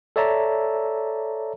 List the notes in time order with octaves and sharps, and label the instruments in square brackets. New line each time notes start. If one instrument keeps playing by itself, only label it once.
[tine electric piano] A4 C#5 D5 E5 A5 A#5